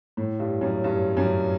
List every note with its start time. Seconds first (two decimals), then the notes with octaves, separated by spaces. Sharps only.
0.17 A2
0.39 G2
0.61 F#2
0.84 G2
1.17 F#2